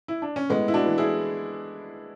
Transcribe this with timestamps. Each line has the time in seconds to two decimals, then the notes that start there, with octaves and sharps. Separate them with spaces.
0.08 E4
0.22 D4
0.36 C#4
0.50 A2 G#3 B3
0.68 E4
0.74 D4 F#4
0.86 E3
0.98 E4 G#4